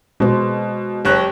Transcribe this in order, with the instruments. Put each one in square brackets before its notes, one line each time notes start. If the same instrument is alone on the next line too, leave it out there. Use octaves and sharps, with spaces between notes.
[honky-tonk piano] B2 [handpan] G#3 C5
[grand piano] F#1 C#5 F#6 [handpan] G4